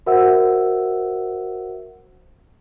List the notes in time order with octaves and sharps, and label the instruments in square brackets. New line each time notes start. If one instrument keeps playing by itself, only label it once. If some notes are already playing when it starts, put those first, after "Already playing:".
[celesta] F#4 A#4 C5 E5 F#5 E6